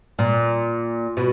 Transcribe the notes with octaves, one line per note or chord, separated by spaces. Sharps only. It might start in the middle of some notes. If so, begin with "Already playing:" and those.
A#2
B2